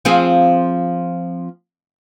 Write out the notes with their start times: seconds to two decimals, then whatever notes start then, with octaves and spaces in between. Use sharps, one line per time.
0.05 F3 C4 G#4